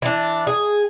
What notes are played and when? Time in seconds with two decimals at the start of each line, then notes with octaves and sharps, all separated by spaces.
0.02 E3 D4
0.47 G#4